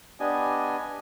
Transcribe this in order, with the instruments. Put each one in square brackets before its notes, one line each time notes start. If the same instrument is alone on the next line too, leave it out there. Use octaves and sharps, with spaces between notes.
[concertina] B3 D4 G4 D5 D#5 G#5